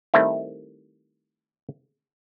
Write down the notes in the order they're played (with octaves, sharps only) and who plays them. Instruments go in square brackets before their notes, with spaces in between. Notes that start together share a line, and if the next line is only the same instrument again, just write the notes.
[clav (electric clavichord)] D#3 G3 A3 C4 E4